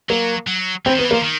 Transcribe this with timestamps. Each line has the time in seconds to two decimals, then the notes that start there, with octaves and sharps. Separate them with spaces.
0.09 F#3 A#3
0.47 F#3
0.86 E3 C4
0.95 D#3 B3
1.04 E3
1.11 A#3
1.14 F3
1.24 D#3